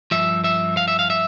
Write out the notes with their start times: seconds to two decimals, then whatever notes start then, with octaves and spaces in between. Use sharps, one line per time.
0.11 G2 F3 E5
0.44 E5
0.77 F5
0.88 E5
0.99 F5
1.10 E5